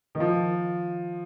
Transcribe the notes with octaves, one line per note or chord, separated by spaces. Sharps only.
D#3
F3